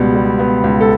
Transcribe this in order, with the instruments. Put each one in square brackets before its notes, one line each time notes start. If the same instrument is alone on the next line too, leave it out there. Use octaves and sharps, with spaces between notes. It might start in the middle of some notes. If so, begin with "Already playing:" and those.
Already playing: [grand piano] C#2 B2 G3 B3
G3
B3
C#2
A4